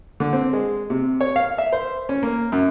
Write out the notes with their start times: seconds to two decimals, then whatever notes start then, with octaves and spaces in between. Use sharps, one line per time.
0.20 D3
0.33 C4
0.53 G#3
0.90 C3
1.21 C#5
1.36 F5
1.58 E5
1.72 C5
2.09 C#4
2.23 A#3
2.52 F#2